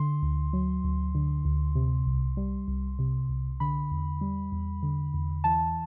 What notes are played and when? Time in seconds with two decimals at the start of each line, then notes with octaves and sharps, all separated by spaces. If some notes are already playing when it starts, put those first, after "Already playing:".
Already playing: D3 C6
0.22 D2
0.53 F#3
0.84 D2
1.15 D3
1.45 D2
1.75 C3
2.07 C2
2.37 G3
2.68 C2
2.99 C3
3.29 C2
3.60 D3 B5
3.91 E2
4.21 G3
4.52 E2
4.83 D3
5.14 E2
5.44 E3 A5